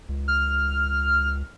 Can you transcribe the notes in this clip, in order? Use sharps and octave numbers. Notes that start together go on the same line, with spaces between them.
C#2
F6